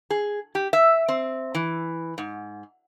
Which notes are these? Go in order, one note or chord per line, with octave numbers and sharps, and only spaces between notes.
G#4
G4
E5
C4
E3
G#2